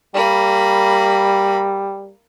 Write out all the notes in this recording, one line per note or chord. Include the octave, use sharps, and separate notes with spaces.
G3 A#3 B5